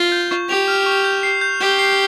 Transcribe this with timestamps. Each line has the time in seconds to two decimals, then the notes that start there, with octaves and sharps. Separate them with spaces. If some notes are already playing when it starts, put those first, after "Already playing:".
Already playing: F4 G7
0.12 G6
0.31 C#6
0.49 G4 F7
0.68 F6
0.86 C#6
1.04 G6
1.23 C7
1.41 G6
1.60 G4 G7
1.79 C7